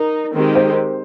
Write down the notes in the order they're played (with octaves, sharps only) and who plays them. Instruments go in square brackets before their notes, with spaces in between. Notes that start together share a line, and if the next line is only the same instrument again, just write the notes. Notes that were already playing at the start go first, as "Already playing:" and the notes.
Already playing: [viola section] D#4 [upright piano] A#4
[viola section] D#3 G#3 C4 G4
[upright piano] C5